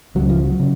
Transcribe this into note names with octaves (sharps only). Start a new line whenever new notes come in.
C#2 C#3 F#3
F3
F#3
C#3